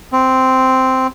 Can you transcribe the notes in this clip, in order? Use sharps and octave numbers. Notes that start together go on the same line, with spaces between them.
C4